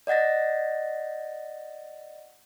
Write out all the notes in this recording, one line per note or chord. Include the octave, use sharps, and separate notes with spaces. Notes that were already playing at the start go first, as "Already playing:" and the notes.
D5 D#5 F#5 A6 A#6